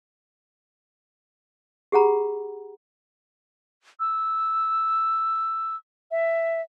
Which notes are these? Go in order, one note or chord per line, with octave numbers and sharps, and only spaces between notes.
G4 G#4 F#5 A#5 B5
E6
E5